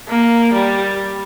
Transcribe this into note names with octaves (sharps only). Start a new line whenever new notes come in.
A#3
G3